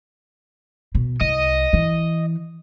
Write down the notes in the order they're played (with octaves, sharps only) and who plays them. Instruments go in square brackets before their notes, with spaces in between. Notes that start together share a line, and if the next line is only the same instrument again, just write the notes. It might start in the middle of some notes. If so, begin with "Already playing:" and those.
[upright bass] B2
[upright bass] C2 [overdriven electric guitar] D#5
[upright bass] E3